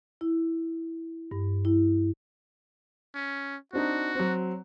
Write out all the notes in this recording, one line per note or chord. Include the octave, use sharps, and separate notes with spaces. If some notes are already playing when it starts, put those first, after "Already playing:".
E4
G2
E4
C#4
C4 D4 D#4 F#4
F#3 C4